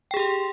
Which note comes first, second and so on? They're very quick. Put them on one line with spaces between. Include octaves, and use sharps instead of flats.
G5 G#4 G4 C6